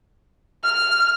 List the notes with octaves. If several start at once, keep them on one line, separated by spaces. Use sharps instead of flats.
F6